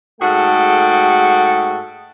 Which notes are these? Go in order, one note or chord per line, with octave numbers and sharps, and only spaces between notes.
G#2 A3 F#4 G#4 A4 G5